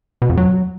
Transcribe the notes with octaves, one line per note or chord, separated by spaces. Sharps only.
B2
F2
F#3